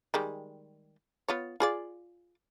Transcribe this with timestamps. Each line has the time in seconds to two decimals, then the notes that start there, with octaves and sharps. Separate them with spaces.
0.14 D#3 G3 G#3
1.28 B3 F4 C#5
1.60 F4 G#4 D5